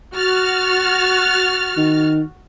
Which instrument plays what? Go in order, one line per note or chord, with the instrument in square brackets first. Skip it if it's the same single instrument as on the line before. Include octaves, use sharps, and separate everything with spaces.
[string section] F#4 F6 A6
[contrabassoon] D#3